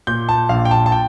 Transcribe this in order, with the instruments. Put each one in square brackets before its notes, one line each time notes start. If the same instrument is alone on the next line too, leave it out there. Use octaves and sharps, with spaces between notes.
[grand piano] A#2 G6
A5
A#1 F5
G5
A5
A5
G5